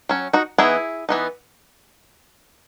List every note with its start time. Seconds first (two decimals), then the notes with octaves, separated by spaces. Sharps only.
0.09 F#3 C#4
0.33 D#4 F#4
0.58 E3 B3 D#4 E4 G#4
1.09 E3 B3 D#4